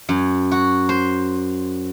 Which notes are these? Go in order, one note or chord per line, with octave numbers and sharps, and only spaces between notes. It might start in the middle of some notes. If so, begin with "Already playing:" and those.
F#2
F#4
C5